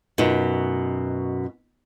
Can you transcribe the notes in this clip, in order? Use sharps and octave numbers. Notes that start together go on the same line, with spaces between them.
F#2 B2 B3 D#4 F4